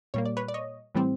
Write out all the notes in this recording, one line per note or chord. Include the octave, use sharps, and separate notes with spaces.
A#2 G3 A#3 C#5
D5
B4 C#5
D5
C#5 D#5
A2 E3 G3 C4